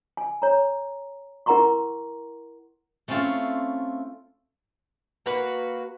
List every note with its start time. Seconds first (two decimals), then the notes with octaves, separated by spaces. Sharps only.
0.17 G#5
0.42 C#5 A#5
1.46 E4 A#4 F#5 A#5 C6 C#6
3.08 A3 C4 C#4 E4 F4 A4
5.26 A#3 F#4 B4